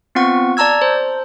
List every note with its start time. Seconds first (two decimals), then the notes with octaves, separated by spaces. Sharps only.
0.15 B3 C4 F4 F#5 C#6
0.57 D5 A5 A#5 E6 G#6
0.82 C5